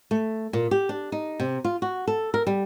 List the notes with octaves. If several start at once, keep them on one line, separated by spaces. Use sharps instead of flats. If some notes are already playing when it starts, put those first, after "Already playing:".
A3
A#2
G4
D4
D#4
C3
F4
F#4
A4
A#4
G3